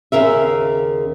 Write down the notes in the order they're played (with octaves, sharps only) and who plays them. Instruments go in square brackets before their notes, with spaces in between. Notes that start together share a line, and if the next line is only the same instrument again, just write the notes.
[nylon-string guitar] D#2 C#3 A#4 E5